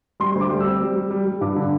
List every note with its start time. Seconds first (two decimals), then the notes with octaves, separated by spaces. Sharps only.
0.20 G3 C6
0.35 D2
0.41 D6
0.50 G3
0.60 E6
0.66 C4
0.81 G3
0.96 G3
1.11 G3
1.26 G3
1.41 G2 D6
1.56 D3